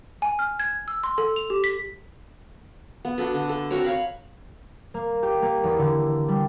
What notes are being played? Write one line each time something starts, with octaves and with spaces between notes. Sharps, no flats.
G#5
F6
G#6
E6
C6
A4
F7
G4
B6
B3
D4 F#4 A4 B4
D3
A4
C4 F#4 A#4 C#5
C#5 F5 B5
A#3
G4
A#3
E2
D3
G3